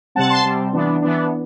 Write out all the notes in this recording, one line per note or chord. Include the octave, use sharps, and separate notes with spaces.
C3 G3 C4 F#5 A5
A5 C6
C3 G3 C4
E3 B3 D4
E3 B3 D4